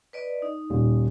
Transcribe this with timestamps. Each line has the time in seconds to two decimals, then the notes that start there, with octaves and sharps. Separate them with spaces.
0.13 B4 D5 D#5
0.42 D#4
0.70 D#1